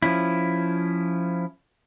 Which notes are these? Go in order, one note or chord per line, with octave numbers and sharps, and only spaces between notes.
F3 C#4 E4